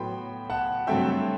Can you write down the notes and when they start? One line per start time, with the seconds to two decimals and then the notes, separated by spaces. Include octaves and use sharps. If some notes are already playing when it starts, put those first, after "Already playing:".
Already playing: A2 F#3 B3 G5 B5 C6
0.50 F#5 A5
0.87 G2 F#3 A3 C4 E5 G5